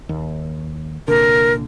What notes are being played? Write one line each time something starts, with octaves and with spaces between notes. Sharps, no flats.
D#2
C2 A#2 D3 A#4